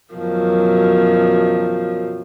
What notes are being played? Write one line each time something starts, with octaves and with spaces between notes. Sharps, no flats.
F#2 B2 D#3 F3 F#3